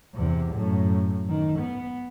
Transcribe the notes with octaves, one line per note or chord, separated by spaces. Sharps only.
E2 C3
F#2 A2
D#3
B3